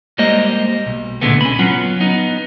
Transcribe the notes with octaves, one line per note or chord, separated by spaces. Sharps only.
G3 G#3 A#3 C5 D#5
B1
C2 A#2 D3 G#3 A3 B3
C#4 B5
F#3 B3 C#4 F4
B3 D#4